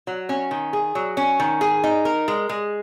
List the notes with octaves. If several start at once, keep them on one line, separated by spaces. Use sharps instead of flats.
F#3
C#4
D#3
G#4
F#3
C#4
D#3
G#4
D#4
A#4
G#3
G#3